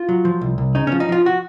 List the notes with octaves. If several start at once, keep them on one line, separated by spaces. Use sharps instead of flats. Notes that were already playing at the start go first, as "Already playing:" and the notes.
Already playing: F4
F#3
F3
C2
C2
C#3 D#4
C#4
F3
D#4
F3 F4
F#4